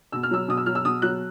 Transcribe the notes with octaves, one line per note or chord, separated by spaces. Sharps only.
B2 E6
F6
F#3 E6
B2 D#6
E6
F#3 F6
E6
B2 D#6
F#3 F#6